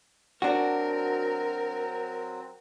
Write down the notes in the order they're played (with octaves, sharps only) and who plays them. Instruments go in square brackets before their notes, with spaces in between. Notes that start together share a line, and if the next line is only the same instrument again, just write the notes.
[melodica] F#3 C4 [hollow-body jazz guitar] D4 F#4 [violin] A#4